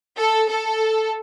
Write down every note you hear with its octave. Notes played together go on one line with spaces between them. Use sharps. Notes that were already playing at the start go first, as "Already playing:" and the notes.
A4
A4